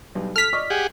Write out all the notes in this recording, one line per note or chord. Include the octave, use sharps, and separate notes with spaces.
B1 G2 G3
A4 F6 B6
D5 D#5 C#6
G4 G#4 F#5